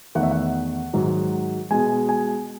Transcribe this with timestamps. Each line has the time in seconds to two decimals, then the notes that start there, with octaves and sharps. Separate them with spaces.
0.15 E2 D#3 A3 F#5
0.23 E5
0.31 F#5
0.93 G#2 D#3 F#3
1.71 B2 G#3 G#5
2.09 G#5